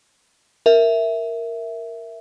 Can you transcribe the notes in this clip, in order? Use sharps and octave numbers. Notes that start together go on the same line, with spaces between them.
A#4 E5